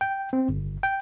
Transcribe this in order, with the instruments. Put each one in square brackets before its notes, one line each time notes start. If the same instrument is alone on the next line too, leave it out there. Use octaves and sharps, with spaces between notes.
[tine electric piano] G5
C4
G1
G5